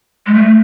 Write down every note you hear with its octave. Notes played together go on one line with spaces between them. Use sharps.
G#3
A3